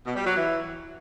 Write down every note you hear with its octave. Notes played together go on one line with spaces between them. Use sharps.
B2
G3
F#3
E3